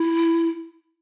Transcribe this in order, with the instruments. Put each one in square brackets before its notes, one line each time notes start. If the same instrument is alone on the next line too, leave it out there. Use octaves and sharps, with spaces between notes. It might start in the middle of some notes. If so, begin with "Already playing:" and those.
Already playing: [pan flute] E4